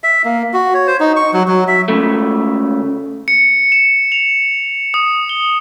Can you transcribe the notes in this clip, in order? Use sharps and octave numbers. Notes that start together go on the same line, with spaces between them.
E5
A#3
F#4
C#5
C5
D#4
C#6
F#3
F#3
E5
C#2 F#2 C#3 A3
C#7
E7
F7
D#6
G7